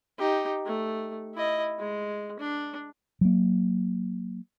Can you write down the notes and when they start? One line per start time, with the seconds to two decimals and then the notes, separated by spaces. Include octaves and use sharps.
0.18 D#4 G4
0.66 A3
1.35 E4 D#5
1.79 G#3
2.39 D4
3.21 F#3 A#3